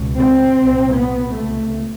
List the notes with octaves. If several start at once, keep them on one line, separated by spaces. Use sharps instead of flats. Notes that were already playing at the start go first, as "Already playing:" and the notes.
Already playing: C#2 B2
C4
C2 A#2
B3
C#2 C3 A3